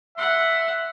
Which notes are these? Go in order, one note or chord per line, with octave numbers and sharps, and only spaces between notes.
E5 F#5 C6